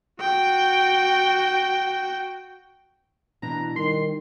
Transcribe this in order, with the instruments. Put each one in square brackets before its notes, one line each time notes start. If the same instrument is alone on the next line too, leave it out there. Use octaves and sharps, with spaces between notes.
[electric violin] F#4 G5
[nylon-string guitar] B2 E3 D4 [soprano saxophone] A#5
[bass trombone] D#3 [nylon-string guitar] G3 [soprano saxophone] C6